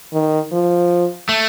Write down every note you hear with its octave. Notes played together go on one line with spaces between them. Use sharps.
D#3
F3
A3